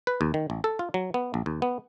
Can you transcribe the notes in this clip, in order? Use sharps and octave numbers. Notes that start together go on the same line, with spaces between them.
B4
D#2
D#3
A1
A4
F4
F#3
B3
A#1
D#2
B3